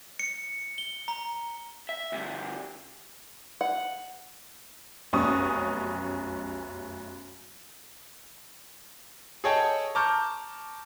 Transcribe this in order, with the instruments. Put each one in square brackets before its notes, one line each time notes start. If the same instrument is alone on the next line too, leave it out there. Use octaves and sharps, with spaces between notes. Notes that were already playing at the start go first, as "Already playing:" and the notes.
[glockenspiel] C#7
G7
A#5
[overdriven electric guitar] E5
D2 G2
[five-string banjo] F#5
[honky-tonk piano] F1 B1 F#2 C#4 C#6 D#6
[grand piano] G#4 A4 C#5 D#5 G5 A5
A5 A#5 C#6 D6 F6 G6